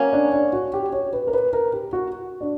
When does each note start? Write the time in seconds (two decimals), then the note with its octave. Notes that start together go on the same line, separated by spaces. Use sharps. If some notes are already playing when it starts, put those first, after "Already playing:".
Already playing: F#3 A#3 C#4
0.13 D4
0.33 D4
0.53 F#4
0.74 G4
0.93 C#5
1.13 B4
1.27 A#4
1.33 B4
1.53 A#4
1.73 G4
1.93 F#4
2.41 D4